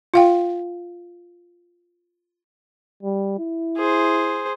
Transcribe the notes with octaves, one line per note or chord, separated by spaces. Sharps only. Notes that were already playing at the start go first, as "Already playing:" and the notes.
F4 F5 G5
G3
E4
G#4 C5